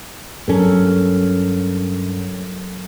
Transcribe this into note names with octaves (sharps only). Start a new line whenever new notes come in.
G2 F#3 C#4 A4 A#4